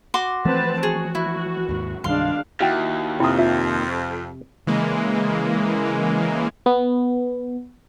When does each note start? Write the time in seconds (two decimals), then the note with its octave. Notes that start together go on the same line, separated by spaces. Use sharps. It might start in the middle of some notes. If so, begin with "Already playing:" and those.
0.14 F#4 C6 D6
0.45 E3 F3 A3 C4 B4 A5
0.83 F#4 G#4
1.15 E4
1.69 D#2 G#2
2.04 C2 G2 D#3 G#3 D4 F5 C6
2.60 D#2 E4 F#4 E5 F5 G5 A6
3.20 F2 C3 E4 D#6
3.38 F4 E5
4.67 C#3 E3 G#3 A#3
6.66 B3